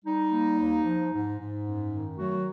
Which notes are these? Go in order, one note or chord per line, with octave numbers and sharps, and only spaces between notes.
G3 D#4
A#3
D#2
F3
G#2
G#2
F#2
D#3
F#3 A3 F#4